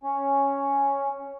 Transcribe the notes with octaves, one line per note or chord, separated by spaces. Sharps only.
C#4